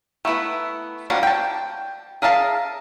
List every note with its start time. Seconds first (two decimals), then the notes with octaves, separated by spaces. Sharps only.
0.25 A3 B3 E4 B4
1.10 F3 G3 A#3 D4 F#4
1.23 G5 A5
2.22 G#4 A#4 E5 F5 A5